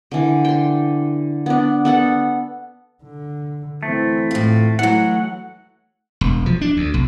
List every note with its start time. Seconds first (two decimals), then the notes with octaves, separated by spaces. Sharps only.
0.12 D3 E3
0.45 G5 C6
1.46 B3 D4
1.85 B3 A4 F#5
3.03 D3
3.83 E3 A3 C4
4.31 A2 F4
4.79 E3 F#3 A3 F#5
6.21 E1
6.46 F3
6.61 D4
6.77 D2
6.94 B1